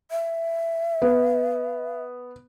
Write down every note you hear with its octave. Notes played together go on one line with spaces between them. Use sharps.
E5
B3